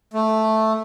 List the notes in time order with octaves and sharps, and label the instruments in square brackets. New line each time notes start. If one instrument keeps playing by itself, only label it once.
[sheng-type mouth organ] A3